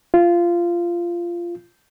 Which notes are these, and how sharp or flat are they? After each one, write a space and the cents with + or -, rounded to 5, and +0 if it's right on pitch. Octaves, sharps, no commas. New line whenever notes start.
F4 -15